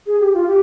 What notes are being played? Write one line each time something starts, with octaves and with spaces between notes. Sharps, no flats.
G#4
G4
F4
G4